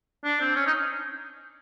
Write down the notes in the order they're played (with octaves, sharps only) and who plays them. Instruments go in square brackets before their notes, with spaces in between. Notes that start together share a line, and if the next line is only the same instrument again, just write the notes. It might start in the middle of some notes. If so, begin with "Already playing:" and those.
[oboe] D4
C4
C#4
D#4